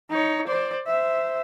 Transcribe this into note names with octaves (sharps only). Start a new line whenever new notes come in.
D#4 C#5
C5 D5
C5 E5